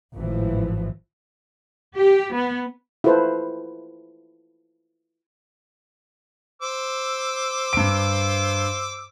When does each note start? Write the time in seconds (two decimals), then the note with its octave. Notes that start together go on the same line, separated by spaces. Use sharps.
0.17 G#1 A2 E3 F3
1.95 G4
2.34 B3
3.04 E4 F4 A4 B4 C5
6.62 C5 D6 E6
7.73 G2 D7